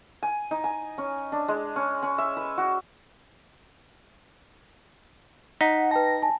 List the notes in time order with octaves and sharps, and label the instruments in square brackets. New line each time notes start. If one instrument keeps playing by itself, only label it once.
[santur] G#5
D#4
G#5
C#4
D4
G#3
C#4
C#4
E5
B4
F#4
[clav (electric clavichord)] D#4 [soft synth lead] F#5 [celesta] B6
[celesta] B4 G5 A5 [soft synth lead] A#6
[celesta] G#5 A5